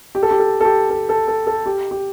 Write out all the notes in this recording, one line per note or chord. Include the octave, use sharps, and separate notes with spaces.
G4
A4
G4
A4
A4
G4
A4
A4
A4
A4
G4
G4